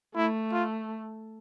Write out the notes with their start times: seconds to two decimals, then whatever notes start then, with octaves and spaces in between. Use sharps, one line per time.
0.15 A3 E4
0.52 F4